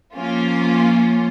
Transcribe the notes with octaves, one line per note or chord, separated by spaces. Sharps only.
F3 A#3 C#4 F4